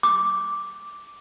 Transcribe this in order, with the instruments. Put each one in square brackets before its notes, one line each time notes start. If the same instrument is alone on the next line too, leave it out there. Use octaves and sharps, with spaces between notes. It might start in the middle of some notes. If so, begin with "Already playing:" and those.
[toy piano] D6